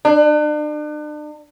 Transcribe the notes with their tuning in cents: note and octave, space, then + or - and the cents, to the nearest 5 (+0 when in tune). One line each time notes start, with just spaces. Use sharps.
D4 +40